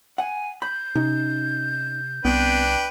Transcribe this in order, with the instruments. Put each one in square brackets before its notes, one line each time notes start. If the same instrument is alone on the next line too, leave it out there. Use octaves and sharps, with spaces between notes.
[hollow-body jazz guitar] F#5 [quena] G#5
[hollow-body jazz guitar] B5 [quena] G6
[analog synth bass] C3 [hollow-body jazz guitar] C#4 D#4
[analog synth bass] C2 [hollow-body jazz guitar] B3 C4 [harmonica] D4 B4 G5